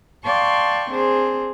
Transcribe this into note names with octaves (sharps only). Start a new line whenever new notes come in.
D5 F5 G5 A5 C6 C#6
C4 D4 G#4 C5